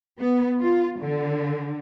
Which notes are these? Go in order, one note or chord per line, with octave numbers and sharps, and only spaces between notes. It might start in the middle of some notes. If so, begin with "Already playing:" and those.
B3
F4
D3